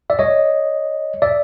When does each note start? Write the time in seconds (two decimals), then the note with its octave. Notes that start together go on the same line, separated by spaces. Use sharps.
0.10 D5 E5
0.19 C#5 D#5
1.22 D5 E5